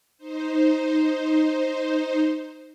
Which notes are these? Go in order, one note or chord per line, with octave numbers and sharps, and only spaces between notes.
D#4 C5